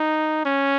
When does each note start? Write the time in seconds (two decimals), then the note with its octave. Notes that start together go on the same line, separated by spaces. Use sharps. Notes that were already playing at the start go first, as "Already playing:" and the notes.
Already playing: D#4
0.45 C#4